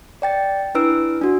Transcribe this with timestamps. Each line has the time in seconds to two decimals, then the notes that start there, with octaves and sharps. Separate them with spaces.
0.22 D5 G5 A6
0.75 D4 E4 B4 E6 D7
1.22 D4 F#4